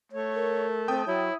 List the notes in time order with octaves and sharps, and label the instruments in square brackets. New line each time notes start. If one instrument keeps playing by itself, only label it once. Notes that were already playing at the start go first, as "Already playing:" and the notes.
[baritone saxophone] A3 [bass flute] C#5
[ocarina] A#4
[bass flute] C4 [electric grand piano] G5 A5 D#6
[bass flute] F#3 [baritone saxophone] E4 [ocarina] C#5